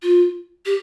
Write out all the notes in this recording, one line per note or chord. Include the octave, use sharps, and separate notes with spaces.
F4
G4